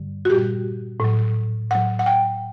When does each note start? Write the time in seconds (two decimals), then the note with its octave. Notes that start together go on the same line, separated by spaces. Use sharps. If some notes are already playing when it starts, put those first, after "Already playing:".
Already playing: G2 D3 G3
0.25 F#4
0.29 A#2 G3 G4
1.00 A2 F#3
1.70 A2 F#3 F#5
1.99 F#5
2.06 G5